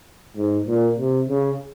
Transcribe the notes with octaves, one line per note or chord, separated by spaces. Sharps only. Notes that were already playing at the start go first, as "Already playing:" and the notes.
G#2
A#2
C3
C#3